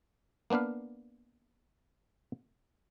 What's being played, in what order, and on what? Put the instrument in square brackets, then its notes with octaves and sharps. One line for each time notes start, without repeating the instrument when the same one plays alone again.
[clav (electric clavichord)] A#3 B3 D4 B4 F5